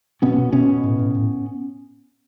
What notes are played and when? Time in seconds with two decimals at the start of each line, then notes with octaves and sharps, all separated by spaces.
0.22 B2 B3 C#4
0.38 B2
0.53 B2 B3 C#4
0.69 B2
0.83 A2
0.99 A2
1.15 A2